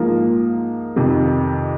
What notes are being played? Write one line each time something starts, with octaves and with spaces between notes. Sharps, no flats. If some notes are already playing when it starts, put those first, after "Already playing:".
Already playing: G#2 F3 A#3
F2 C3 D#3